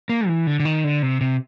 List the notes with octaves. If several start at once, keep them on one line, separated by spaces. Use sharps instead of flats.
A#3
E3
D3
D3
D#3
D3
C3
C3